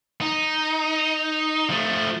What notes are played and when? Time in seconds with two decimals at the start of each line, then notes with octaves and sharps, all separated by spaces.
0.21 D#4
1.70 F3 A3